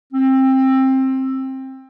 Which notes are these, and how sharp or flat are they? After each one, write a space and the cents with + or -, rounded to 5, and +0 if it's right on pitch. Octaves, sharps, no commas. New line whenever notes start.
C4 +20